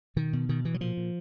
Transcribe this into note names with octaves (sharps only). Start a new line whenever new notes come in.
B2 D#3
B2
B2 D#3
B2 E3
F#3
A#2 F3
A#2